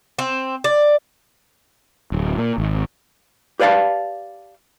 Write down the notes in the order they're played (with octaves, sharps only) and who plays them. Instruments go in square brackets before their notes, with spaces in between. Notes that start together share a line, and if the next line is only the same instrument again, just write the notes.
[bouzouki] C4
D5
[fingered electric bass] D1
A#2
G#1
[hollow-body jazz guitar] G4 B4 D5 F5 A5